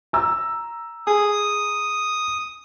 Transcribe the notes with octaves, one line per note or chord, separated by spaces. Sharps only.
A#5 E6
G#4 D#6